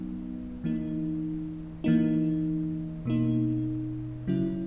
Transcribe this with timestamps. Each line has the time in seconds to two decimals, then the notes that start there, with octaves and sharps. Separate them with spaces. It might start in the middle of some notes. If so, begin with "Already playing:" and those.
Already playing: F#3 B3 D#4
0.64 E3 A#3 D#4
1.84 E3 A#3 D#4
3.05 B2 A#3 D#4
4.28 C#3 F#3 C#4 E4